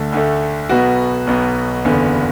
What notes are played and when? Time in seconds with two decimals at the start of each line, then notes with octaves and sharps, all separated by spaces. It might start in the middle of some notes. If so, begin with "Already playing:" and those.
Already playing: D2 D3 A3 A4
0.12 D2 D3 A3
0.69 B1 B2 B3 F#4
1.27 B1 B2 B3
1.85 F#1 E2 D3 B3